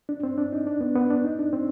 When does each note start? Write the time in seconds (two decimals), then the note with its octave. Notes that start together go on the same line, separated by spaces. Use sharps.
0.09 D4
0.23 C4
0.38 D4
0.53 D#4
0.67 D4
0.81 B3
0.95 B3
1.10 D4
1.24 D#4
1.39 D4
1.53 C4